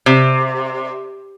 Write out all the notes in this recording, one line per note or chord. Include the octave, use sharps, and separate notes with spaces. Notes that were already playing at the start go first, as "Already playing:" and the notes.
C3